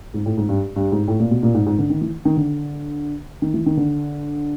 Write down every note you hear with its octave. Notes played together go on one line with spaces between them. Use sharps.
G#2
A2
G#2
G2
G2
G#2
A2
A#2
B2
A#2
G#2
G#2
D3
D#3
E3
D#3
D3
D#3
E3
D#3
D3